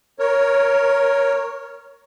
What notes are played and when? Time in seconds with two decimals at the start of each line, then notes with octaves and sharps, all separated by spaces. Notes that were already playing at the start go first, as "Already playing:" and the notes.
0.19 A#4 C#5